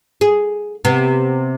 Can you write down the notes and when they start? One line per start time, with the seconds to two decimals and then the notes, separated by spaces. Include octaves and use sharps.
0.21 G#4
0.85 C3 B3